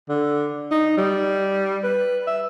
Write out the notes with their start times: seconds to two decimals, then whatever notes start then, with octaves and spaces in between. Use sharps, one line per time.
0.09 D3
0.71 D#4
0.97 G3
1.84 B4
2.27 E5